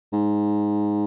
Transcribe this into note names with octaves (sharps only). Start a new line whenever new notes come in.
G#2